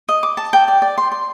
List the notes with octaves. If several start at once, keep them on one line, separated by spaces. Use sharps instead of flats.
D#5
D6
A5
G5
D5
D5
C6
C6